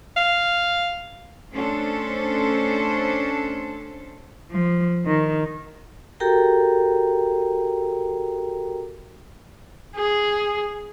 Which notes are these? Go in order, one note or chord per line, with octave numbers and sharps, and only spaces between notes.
F5
A3 C#4 D4 A4 C5
F3
D#3
F#4 G4 A4 A#4 G5 A#5
G#4